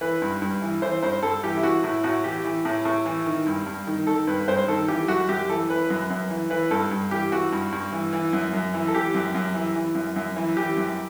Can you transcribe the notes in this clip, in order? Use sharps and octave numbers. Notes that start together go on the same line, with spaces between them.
E3 B4
G2
G2
E3
E3 C5
G2 C5
G2 A4
E3 G4
E4
E3 F#4
A2 E4
A2 F#4
E3 G4
E3
A2
A2
E3
D#3
G2
G2
D#3
D#3 A4
G2 B4
G2 C5
D#3 A4
E3 G4
F#2 F#4
F#2 G4
E3 A4
E3 B4
F#2
F#2
E3
E3 B4
G2 A4
G2
E3 G4
E3 F#4
G2
G2
E3
E3
F#2
F#2
E3
A4
E3 G4
F#2
F#2
E3
E3
F#2
F#2
E3
E3 G4
F#2